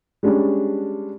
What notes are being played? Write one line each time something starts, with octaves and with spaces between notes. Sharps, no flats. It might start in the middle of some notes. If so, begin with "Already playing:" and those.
G3 G#3 C#4 D4